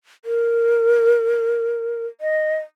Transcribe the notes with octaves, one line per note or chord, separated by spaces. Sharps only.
A#4
D#5